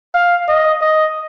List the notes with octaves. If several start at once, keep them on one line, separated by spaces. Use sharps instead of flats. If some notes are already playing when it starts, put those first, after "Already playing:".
F5
D#5
D#5